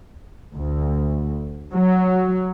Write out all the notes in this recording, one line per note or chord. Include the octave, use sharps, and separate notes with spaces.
D2
F#3